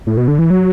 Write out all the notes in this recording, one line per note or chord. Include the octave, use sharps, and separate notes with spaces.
A2
B2
D3
E3
F#3